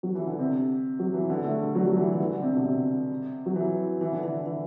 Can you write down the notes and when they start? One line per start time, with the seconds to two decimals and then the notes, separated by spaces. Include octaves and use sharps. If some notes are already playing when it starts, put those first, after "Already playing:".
0.03 F#3
0.15 E3
0.27 D3
0.39 C3
0.99 F#3
1.14 E3
1.30 D3
1.44 A3
1.53 G3
1.63 G3
1.75 F#3
1.86 F#3
1.97 E3
2.13 E3
2.20 D3
2.42 C3
2.56 B2
2.65 C3
3.46 F#3
3.56 E3
4.01 E3
4.12 D3
4.23 E3
4.46 E3